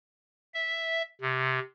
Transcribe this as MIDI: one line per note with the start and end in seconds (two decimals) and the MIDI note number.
0.54 1.02 76
1.21 1.59 48